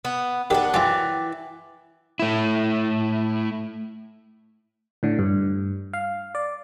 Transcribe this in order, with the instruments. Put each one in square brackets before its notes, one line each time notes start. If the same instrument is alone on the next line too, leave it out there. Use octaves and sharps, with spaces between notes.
[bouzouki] B3
[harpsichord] D#3 G4 [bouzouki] B3 C#4 D4 [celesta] A#4
[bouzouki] E3 [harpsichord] F#3 F4 E5 [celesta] G5 D6 A6
[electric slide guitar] A3 E4
[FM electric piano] A2 D3
G2
F5
D5